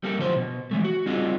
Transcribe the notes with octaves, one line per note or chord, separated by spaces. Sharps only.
G3 A#3 A4
F#2 D3 F3 G#4 C5
B2
E3 G#3 A3
F#4
G3 C4 D4 D#4 F4 G#4